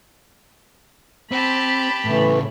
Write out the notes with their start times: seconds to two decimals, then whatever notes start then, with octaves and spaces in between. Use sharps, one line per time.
1.31 C4 G4 A5 B5
2.05 A2 C#3 E3 A3